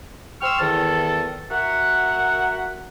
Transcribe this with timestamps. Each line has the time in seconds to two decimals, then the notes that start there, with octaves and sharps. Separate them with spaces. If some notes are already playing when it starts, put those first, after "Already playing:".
0.41 C5 G5 C#6 E6 F6
0.59 E2 D#3 A4
1.50 F#4 A#4 E5 F#5